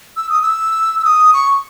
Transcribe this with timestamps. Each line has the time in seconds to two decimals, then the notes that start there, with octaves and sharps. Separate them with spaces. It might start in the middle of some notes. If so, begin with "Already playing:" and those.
0.17 E6
0.29 D#6
0.42 E6
1.00 E6
1.05 D#6
1.34 C#6